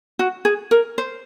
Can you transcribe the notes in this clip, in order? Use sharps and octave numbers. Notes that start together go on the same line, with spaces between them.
F#4
G#4
A#4
C5